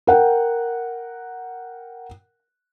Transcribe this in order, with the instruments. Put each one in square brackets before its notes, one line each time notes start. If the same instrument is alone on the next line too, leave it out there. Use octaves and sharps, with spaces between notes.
[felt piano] A#4 F#5 G5